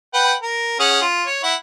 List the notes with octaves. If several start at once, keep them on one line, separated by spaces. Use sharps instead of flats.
B4 F#5 G5
A#4
C#4 G#4 F#5
F4
C#5
E4 F#5